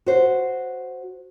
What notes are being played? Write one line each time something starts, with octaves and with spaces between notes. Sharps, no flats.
F#4 C5